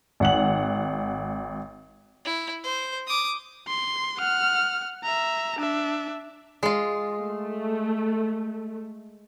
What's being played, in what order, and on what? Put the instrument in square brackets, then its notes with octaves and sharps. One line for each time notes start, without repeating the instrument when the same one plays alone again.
[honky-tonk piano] G#1 F#5 F#7
[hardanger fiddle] E4
C5
D6 D#6
[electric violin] C6
F#5 F6
E5 A#5
D4 E5
[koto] G#3 F4
[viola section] A3